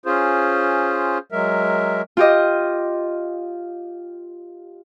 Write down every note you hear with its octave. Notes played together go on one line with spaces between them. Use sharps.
C#4 F4 G#4 C5
F#3 G#3 A#4 E5
F4 G4 D#5